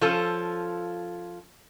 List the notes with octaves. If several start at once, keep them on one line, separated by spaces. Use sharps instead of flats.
F3 C#4 F4 A4